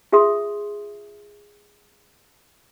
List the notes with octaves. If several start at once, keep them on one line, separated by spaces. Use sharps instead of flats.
F4 G#4 E5 C6 D#6